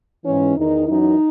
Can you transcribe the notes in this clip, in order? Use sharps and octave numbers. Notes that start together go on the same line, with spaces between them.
G#2 E3 C#4
E2 D#3 D#4
F#2 E3 D#4